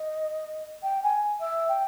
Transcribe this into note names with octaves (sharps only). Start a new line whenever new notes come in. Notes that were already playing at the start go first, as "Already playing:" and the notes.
Already playing: D#5
G5
G#5
E5
G5